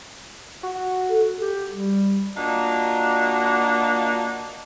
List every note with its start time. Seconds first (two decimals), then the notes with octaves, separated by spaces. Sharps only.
0.63 F#4
1.10 A4
1.41 G4
1.72 G3
2.37 A#3 D4 D#4 F4 F#4